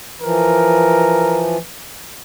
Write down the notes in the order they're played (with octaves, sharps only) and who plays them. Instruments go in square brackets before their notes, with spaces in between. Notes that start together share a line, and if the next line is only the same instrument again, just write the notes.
[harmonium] E3 F3 [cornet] A#4